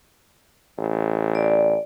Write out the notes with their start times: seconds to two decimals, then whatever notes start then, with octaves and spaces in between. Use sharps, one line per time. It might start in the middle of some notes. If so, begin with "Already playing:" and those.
0.78 A1
1.35 D5